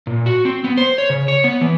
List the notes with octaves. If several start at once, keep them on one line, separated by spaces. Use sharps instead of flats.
A#2
F#4
C4
B3
C5
C#5
C#3
C#5
B3
E3